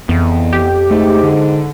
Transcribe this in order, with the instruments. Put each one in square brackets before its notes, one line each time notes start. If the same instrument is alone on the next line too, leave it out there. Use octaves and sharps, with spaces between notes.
[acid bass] F2 [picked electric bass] E3 B3
[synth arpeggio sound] G4
[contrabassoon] G#2 [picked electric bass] A3
[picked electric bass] D3